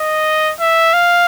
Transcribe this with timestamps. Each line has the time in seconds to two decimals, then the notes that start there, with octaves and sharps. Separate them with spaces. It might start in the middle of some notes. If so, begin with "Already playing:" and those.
Already playing: D#5
0.60 E5
0.93 F5